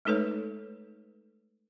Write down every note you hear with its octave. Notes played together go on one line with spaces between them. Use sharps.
G#3 A3 D#4 A4 B4 C#5